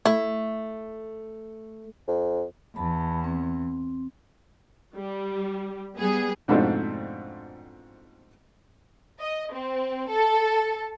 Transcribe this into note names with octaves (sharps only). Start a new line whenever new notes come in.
A3 E4
F2
E2 A5 B5
C4
G3
G3 B3 G#4
F2 G#2 B2 A3 C4 D4
D#5
C4
A4